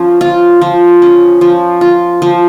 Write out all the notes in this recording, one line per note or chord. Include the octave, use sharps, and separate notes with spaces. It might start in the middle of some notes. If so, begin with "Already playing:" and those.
Already playing: F3 C#4
F4
F3
C#4
F3
F4
F3